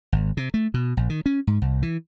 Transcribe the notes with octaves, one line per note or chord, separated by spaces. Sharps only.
G#1
C3
A3
B2
A#1
D#3
C#4
G#2
C2
E3